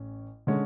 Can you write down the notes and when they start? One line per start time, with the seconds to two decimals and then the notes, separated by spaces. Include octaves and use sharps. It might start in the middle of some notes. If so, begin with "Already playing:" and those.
Already playing: A1 C#4
0.47 D3 G#3 C#4